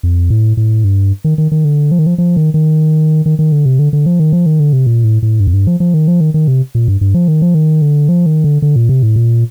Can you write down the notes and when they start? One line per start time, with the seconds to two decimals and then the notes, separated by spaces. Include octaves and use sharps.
0.03 F2
0.30 A2
0.57 A2
0.84 G2
1.24 D#3
1.38 D#3
1.52 D#3
1.65 D3
1.92 F3
1.99 D#3
2.06 F3
2.18 F3
2.36 D#3
2.54 D#3
3.26 D#3
3.39 D#3
3.52 D3
3.66 C3
3.79 D3
3.93 D3
4.06 F3
4.20 D#3
4.33 F3
4.46 D#3
4.60 D3
4.73 C3
4.87 A#2
5.04 A2
5.22 A2
5.40 G2
5.47 F2
5.53 G2
5.67 F3
5.80 F3
5.94 D#3
6.08 F3
6.21 D#3
6.34 D#3
6.48 C3
6.75 A#2
6.88 G2
7.01 G2
7.15 F3
7.28 D#3
7.42 F3
7.55 D#3
7.82 D3
8.09 F3
8.26 D#3
8.44 D3
8.62 D3
8.76 A#2
8.89 C3
9.03 A2
9.16 A#2